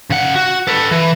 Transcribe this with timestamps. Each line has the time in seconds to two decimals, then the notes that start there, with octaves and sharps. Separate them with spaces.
0.10 C#3 F#5
0.36 F#4
0.67 A4 B4
0.91 E3